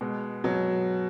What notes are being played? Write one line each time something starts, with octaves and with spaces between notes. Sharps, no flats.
B2 G#3
B2 F#3